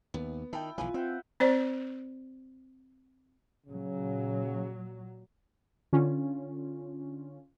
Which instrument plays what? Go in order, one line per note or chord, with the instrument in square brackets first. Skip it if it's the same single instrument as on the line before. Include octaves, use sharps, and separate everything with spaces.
[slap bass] D#2 [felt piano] B3
[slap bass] D#3 [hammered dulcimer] E4 [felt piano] G5 A5
[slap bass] B1 E3 F3 [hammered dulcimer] F4 B4 [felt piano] G#5
[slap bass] C4 [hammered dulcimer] E5 F#5 G5
[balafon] C4 C5 D5
[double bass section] A#2 F#3 [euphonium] C#3
[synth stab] D3 C#4 F4